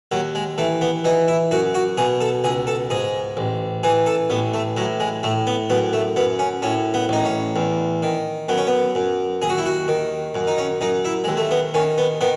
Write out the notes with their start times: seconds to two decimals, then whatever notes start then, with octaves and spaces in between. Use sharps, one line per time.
0.12 D#2 F#3
0.35 G#3
0.58 E3 A3
0.81 B3
1.04 E3 D#4
1.28 E4
1.51 F#2 F#4
1.75 F#4
1.97 B2 G#4
2.21 A4
2.44 C#2 G#4
2.67 A4
2.90 G#2 G#4
3.37 A1
3.83 E3 G#4
4.06 A4
4.30 A1 B3
4.54 A3
4.77 A2 F#3
5.00 G#3
5.23 A2 A3
5.47 B3
5.70 F#2 B3
5.93 A3
6.16 F#2 B3
6.39 C#4
6.62 A2 C#4
6.94 B3
7.09 A1 D#4
7.25 C#4
7.56 E2
8.02 D#3
8.49 F#2 B3
8.58 C#4
8.67 B3
8.95 F#2
9.42 D#2 G#4
9.50 F#4
9.58 E4
9.66 F#4
9.88 D#3
10.35 F#2
10.47 D#4
10.58 C#4
10.81 F#2 D#4
11.05 E4
11.24 D#2 G#3
11.37 A3
11.51 B3
11.74 D#3 C#4
11.98 B3
12.21 D#3 B3